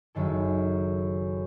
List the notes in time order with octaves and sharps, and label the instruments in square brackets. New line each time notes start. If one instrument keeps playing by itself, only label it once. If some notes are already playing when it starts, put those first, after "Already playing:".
[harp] F#1 F#2 D#3 A4